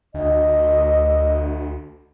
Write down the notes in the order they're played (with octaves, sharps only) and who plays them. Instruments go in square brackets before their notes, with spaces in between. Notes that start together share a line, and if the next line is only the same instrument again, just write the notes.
[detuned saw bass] D2 [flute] D#5